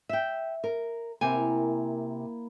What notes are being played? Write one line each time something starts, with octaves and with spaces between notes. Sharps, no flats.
E5 G5
A#4
C3 A#3 E4 A#4 G#5